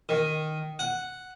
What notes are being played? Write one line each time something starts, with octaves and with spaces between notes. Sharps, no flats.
D#3
F#5